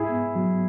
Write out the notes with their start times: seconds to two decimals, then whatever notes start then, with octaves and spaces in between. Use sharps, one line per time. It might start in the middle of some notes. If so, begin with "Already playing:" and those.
Already playing: G#2 E4 G#4
0.09 B3
0.36 F#3